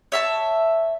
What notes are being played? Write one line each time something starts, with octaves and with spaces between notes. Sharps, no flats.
C#5 E5 A5